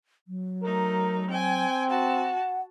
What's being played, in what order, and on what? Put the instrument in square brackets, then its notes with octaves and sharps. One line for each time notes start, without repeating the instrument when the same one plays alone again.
[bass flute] F#3
[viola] A3 D#4 [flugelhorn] A#4
[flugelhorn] C4 [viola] G5 G#5
[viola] F#4 A5 [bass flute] F#5